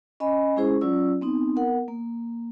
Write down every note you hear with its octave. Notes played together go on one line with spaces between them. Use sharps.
C#4 D#5 G#5 B5
G#3 C#4 E4 G#4 C5 C#6
F#3 C#4 F4 D5 E6
B3 C4 D#4
B3 A#4 F#5
A#3